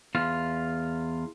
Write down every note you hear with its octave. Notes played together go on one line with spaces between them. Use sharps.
E2 F4